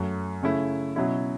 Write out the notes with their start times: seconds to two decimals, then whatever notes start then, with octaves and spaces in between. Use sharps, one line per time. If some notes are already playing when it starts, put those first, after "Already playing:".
Already playing: F#2 F#3 A3
0.43 C#3 A3 C#4 E4
0.96 B2 F#3 C#4 E4